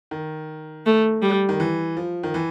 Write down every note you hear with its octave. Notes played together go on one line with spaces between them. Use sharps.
D#3
A3
G3
D#3
E3
F3
D#3
E3